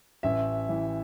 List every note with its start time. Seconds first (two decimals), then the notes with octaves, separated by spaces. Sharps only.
0.23 A1 E5
0.69 E3